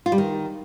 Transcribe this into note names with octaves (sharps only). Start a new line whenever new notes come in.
F4
G3
D#3